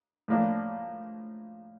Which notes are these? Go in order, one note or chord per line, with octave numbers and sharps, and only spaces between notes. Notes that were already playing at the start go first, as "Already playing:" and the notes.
A2 F3 A#3 D4